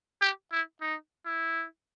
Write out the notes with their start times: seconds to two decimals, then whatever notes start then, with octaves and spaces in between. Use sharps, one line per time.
0.21 G4
0.52 E4
0.81 D#4
1.25 E4